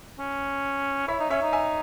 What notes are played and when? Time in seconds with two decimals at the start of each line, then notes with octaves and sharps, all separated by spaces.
0.19 C#4
1.08 E4 C#5 E5
1.20 D#4
1.30 C#4 C#5 E5
1.42 D#4
1.53 E5 G#5